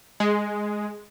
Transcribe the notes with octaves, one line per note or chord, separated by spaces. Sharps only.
G#3